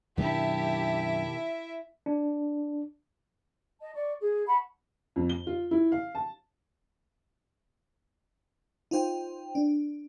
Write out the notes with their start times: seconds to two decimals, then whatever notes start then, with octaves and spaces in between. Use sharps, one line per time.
0.17 F#2 B2 D#3 D4 E4 G4 E5 A5
2.06 D4
3.80 D#5 A5
3.94 D5 C#6
4.19 G#4
4.47 F#5 A5 B5 C#6
5.16 F2
5.29 G7
5.47 F4
5.71 E4
5.92 F5
6.15 A5
8.91 D#4 F4 C5 G5
9.55 D4